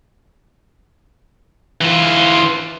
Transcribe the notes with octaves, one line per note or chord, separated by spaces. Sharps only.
E3 F4